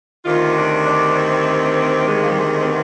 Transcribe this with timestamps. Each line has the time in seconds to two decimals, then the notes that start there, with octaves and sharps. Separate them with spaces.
0.25 D2 C3 D#3 F4
0.56 D4
0.86 D4
1.15 C4
2.07 G#3
2.23 F3
2.30 G3
2.37 G#3
2.60 C4
2.67 B3